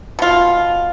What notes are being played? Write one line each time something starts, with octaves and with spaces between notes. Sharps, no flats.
B2 F4